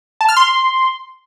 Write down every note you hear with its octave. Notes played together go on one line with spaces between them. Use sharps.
A5
F6
C6